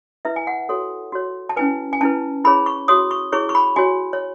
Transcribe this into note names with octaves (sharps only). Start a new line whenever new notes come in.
E4 B4 E5
G#5
F#5
F#4 A4 C#5
F#4 C#5
A5
C#4 E4 B4 G#5
G#5
C#4 E4 B4 A5
E4 G#4 C#5 B5
C#6
F#4 C#5 D#6
C#6
E4 G#4 C#5 C#6
C#6
B5
F#4 C#5 G#5
C#5